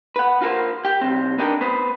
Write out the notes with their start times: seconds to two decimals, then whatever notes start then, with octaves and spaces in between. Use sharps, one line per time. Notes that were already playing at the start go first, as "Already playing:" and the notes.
0.16 B4 F#5
0.42 F4 F#4 A4 A#4 C5
0.85 G4 G5
1.01 B1 C4
1.38 B3 D4 D#4 G4 A4 A#4
1.61 B3 B4 C5